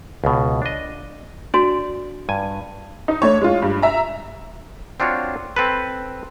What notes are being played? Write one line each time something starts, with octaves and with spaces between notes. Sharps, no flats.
C#2 B2
D4 D#5
D4 F#4 D5
G2 G#5
D#4
A3 D4 C#5
G#3 F4
G2
E5 A#5
C4 D4 F4 F#4 C#5
C4 A4 B4